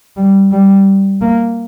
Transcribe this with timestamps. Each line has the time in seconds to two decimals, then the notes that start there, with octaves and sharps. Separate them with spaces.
0.17 G3
0.52 G3
1.21 A#3